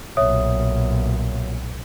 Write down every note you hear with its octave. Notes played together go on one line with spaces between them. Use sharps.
B1 A#2 C#5 E5 D#6